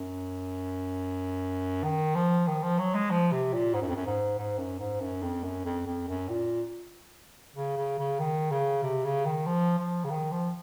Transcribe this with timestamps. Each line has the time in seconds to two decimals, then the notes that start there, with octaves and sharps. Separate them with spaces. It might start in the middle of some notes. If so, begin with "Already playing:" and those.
Already playing: F#2
1.84 D#3
2.15 F3
2.47 D#3
2.63 F3
2.79 F#3
2.95 G#3
3.11 F3
3.32 C3
3.53 A#2
3.74 G#2
3.82 F#2
3.89 F2
3.96 F#2
4.06 G#2
4.38 G#2
4.59 F#2
4.80 G#2
5.01 F#2
5.22 F2
5.43 F#2
5.65 F2
5.86 F2
6.08 F#2
6.29 A#2
7.56 C#3
7.77 C#3
7.99 C#3
8.19 D#3
8.51 C#3
8.83 C3
9.04 C#3
9.25 D#3
9.46 F3
9.78 F3
10.04 C#3
10.10 D#3
10.32 F3